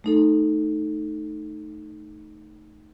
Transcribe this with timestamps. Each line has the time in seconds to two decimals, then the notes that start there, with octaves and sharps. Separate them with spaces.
0.04 A3 D#4 A4